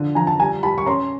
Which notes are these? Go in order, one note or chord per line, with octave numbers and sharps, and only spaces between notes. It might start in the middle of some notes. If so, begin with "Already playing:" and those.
Already playing: D3 F3
F3 G#5 A#5
A5
G3 G#5 A#5
G3 A5 B5
C#6
C#4 A#5 C6